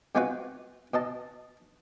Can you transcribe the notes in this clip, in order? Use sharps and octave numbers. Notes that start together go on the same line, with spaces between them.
C3 G#3 B3 F4 F#4 B4
B2 D#5 A5